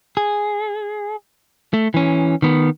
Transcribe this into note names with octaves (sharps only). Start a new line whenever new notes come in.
G#4
A3
E3 C#4
D#3 B3